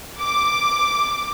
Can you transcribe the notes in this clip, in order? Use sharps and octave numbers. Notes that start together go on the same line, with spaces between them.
D6